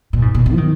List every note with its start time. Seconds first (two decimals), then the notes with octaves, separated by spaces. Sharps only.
0.13 A#2
0.22 G#2
0.35 A#2
0.46 B2
0.53 F3
0.58 D#3